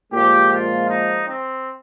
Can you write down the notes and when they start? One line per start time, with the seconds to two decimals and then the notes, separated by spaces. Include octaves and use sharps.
0.12 A#2 F3 G#3 G4
0.50 F4
0.88 D#4
1.27 C4